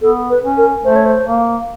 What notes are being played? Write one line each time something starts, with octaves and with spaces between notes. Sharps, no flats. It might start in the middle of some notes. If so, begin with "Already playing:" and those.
B3 A4
B4
C#4
A#4
A3 C5
C#5
C5
A#3